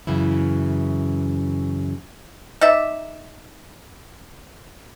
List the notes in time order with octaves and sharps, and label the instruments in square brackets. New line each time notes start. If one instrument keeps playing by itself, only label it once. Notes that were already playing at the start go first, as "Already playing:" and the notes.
[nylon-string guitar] F#2 C#3 E3 E4
[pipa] D#4 D5 E5